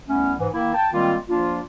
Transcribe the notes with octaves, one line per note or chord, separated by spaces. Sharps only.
C2 A3 B3 C#4
G#2 E3
D#3 A#3 E4
G5 A5
D#3 G3 G#3 A#3 C4 F4
F3 A#3 D4 F4